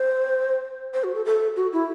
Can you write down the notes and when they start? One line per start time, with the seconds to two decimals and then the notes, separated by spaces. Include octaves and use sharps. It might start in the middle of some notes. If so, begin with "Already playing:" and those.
Already playing: C5
0.94 C5
1.04 F#4
1.15 A4
1.25 A4
1.56 F#4
1.73 E4